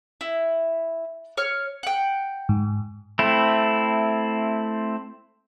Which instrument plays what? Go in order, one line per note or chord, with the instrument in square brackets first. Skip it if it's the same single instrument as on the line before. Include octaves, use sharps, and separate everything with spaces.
[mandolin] E4
C#5 F6
F#5 G5
[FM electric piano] G#2
[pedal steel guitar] A3 C4 E4